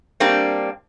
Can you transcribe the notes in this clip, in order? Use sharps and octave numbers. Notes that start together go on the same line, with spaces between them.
G3 A#3 C4 D4